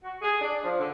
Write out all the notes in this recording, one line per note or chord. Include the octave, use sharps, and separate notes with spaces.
F#4
G#4
D4
F3
D3